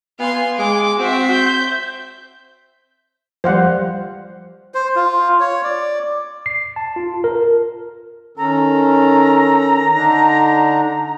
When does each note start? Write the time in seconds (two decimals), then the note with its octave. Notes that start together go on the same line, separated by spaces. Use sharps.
0.20 B3 F5 G#5 C6
0.59 G#3 D6
0.99 C4 F#4 C5 E5
1.32 G6
3.44 F3 G3 C5 F5 F#5
4.74 C5
4.96 F4
5.40 C#5
5.64 D5
6.46 C7
6.76 A5
6.96 F4
7.24 A#4
8.37 D#3 C#4 A4 A#5
9.94 D3 D4 D#4